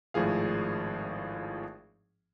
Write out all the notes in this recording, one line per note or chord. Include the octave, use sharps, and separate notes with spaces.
G#1 A2 F3 G#4 F5